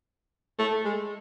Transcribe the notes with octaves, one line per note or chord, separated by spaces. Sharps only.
A3
G#3